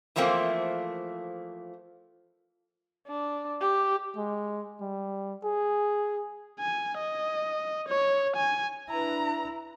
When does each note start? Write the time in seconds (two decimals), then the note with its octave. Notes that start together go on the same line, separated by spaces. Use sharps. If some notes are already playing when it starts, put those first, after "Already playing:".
0.16 E3 F3 A3 A#3 C4
3.07 D4
3.61 G4
4.17 G#3
4.81 G3
5.44 G#4
6.60 G#5
6.98 D#5
7.88 C#5
8.36 G#5
8.89 D4 E4 B4 A#5